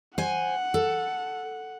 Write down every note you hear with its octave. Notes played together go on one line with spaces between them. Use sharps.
C5 F#5 G#5
A4